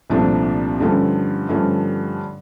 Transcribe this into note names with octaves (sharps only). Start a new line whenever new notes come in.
C2 A#2 F3 A3 D4
G2 D3 F3 A3 C#4
G2 D3 F3 A3 C#4